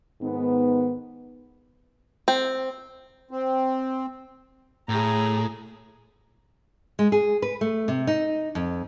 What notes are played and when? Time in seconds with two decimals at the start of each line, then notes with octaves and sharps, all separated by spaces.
0.21 G#2 D#3 B3
2.28 C4
3.31 C4
4.89 A2 G#4 A#5
6.99 G#3
7.12 G#4
7.42 B4
7.61 A3
7.88 C3
8.07 D#4
8.55 F2